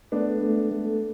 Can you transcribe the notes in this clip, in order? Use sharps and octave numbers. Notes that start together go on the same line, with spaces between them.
A3 B3 D4
A3
A3